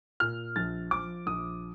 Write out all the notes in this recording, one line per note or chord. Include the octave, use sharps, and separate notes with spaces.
A#2 F6
A#1 A6
F3 D6
A#1 D#6